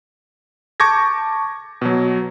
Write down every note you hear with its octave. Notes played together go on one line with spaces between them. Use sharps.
A5 C#6 D6 G6 G#6 A#6
B2 F#3